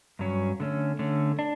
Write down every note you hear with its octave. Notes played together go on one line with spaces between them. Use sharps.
G2 F#3 C#4
D3 A3 C#4
D3 A3 C#4
D4